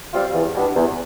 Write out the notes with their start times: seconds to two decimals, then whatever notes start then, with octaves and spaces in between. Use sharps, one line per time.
0.13 G3 C4 F4
0.34 E2
0.54 B2 G3 B3 D4
0.75 E2